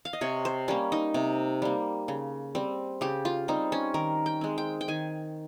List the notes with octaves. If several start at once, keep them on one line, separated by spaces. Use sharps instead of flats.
F5
D#5
C3 C#5
C5
G3 A#3 C#4
D#4
C3
G3 A#3
C#3
G3 C4
C#3 G4
F4
G3 C4 D#4
C#4
D#3 A#4
G5
G#3 C4
G5
G5
D#3 G#5